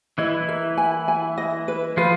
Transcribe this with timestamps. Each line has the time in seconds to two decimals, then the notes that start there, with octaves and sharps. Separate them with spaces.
0.18 E3 E4 D#5
0.48 A#4
0.78 G#5
1.08 G#5
1.38 D#5
1.68 B4
1.97 F3 F4 B4